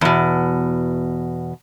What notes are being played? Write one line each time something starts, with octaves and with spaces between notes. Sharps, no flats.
E2 B2